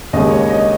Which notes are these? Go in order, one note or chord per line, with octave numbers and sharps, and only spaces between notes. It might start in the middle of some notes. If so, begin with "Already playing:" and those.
D#2 C#3 G#3 D#5
C#5
D#5